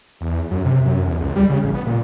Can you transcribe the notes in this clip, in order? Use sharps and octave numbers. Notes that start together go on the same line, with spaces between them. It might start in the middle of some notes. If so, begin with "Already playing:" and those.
E2
F#2
C3
F#2
E2
C#2
G3
C#3
A1
B3
A#2